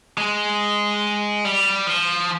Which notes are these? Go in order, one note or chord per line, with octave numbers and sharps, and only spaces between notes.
G#3
G3
F3